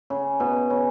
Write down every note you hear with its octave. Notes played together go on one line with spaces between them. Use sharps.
C#3
B2
C#3